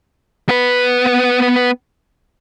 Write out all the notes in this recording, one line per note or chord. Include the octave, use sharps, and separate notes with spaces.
B3 B4